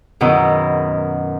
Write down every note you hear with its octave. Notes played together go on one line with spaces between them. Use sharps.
F#2 B2 D#3 E4